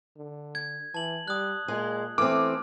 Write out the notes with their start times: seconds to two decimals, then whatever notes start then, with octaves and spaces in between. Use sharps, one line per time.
0.16 D3
0.55 G#6
0.94 E3 A5 F#7
1.28 G3 D#6 F#6
1.68 A#2 G#3
2.18 E3 A3 C4 D6 F6